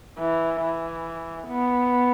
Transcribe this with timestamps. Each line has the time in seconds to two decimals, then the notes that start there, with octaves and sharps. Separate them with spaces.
0.18 E3
0.61 E3
1.47 B3